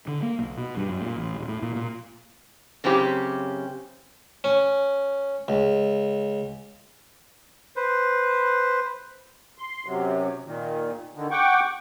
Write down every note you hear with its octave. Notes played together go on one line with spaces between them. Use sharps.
D3
A#3
B1
B2
G2
F#2
A#2
A1
D#1
A2
A#2
A#2
F#2 C#3 C4 C#4 G4
C#4
C#2
B4 C5
C6
F#2 C3 F#3
A#2 D#3
D3 D#3
F#5 G5 C#6 D6